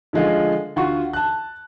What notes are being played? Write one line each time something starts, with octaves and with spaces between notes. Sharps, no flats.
D3 F3 G#3 A3 F4
D2 F4 F#4 C#6
A5 F#6